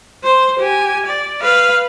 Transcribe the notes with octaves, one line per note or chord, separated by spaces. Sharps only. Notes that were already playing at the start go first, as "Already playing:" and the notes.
C5
G4 G#5
D5
B4 F5